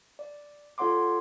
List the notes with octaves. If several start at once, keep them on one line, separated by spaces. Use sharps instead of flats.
D5
F4 A4 C#5 F#5 C6 D6